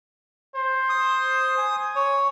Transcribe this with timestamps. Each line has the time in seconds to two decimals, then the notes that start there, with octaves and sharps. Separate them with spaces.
0.55 C5
0.89 D#6
1.57 G#5
1.96 C#5